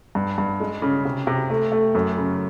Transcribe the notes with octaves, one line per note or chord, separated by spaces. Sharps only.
G2
G2
G#3
C#3
C3
C3
A3
A3
F#2
C#3